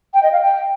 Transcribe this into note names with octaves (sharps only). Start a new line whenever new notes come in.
G5
D#5
F5
G5